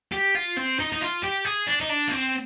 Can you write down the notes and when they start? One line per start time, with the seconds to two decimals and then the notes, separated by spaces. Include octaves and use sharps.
0.12 G4
0.35 F4
0.57 C4
0.80 D#4
0.92 D#4
1.02 F4
1.24 G4
1.45 G#4
1.67 D4
1.81 D#4
1.89 D4
2.08 A#3
2.12 C4